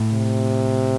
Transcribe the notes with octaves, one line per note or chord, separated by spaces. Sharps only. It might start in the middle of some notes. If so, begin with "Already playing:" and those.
Already playing: A2
C3